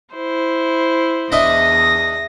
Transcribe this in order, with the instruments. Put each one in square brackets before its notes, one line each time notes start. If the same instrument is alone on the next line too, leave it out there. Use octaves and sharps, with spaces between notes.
[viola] E4 C5
[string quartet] E2 D#6 A#6 [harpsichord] D4 D#5 E5